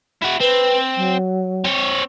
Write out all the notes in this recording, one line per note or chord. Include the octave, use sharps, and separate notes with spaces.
E4 F#4
C4 B4
F#3
C4 C#5